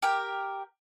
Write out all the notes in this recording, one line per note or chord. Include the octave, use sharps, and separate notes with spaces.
G4 A#4 G5